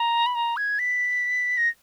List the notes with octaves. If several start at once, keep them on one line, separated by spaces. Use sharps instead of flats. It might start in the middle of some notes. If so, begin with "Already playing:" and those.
Already playing: A#5
B5
A#5
G#6
B6
A#6